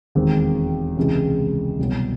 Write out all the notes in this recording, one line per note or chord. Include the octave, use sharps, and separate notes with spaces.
E1 D#2 D#3 G#3 C4
C#2 C3 E3 G#3
C2 B2 F#3